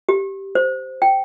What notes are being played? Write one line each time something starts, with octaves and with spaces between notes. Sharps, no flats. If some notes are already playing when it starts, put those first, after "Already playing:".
G4
C5
G5